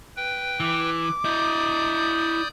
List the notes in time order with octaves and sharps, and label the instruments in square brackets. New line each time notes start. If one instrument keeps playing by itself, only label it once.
[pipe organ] B4 G5
[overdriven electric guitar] E3 [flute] D6
[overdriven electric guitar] E4 D#5 [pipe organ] D5 D#6 G6